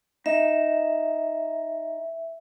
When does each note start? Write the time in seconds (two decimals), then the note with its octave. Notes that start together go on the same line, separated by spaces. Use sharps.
0.26 D#4 E5